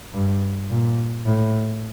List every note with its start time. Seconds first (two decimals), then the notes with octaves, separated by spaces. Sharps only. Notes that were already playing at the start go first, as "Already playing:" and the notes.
0.14 G2
0.70 A#2
1.26 A2